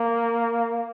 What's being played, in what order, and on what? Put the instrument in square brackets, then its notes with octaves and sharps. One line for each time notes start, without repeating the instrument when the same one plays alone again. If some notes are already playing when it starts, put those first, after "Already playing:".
Already playing: [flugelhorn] A#3